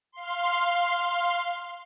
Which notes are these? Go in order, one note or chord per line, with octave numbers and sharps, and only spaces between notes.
F5 C6